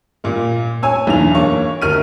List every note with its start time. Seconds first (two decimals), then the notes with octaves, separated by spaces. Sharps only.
0.24 A#2 A#3
0.83 C#5 G#5 E6
1.07 B1 E2 D4 F7
1.35 A#3 C#5 C#6
1.82 D2 A#4 F6 D#7